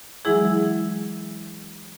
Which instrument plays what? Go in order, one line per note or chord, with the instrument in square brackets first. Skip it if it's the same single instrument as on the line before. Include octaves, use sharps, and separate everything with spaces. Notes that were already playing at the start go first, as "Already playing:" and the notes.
[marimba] E3 F#3 G#3 E4 G#4